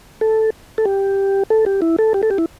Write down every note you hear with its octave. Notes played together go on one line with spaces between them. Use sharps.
A4
A4
G4
A4
G4
E4
A4
G4
A4
G4
E4